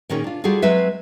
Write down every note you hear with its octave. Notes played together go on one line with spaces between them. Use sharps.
A#2 D#3 C#4 G#4
D4 F4
G3 F4 F#4 G#4 A4
F#3 G#3 C4 B4 E5